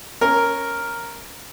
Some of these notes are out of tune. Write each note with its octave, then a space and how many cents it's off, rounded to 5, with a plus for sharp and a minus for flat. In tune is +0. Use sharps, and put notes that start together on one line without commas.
C#4 -10 A#4 +0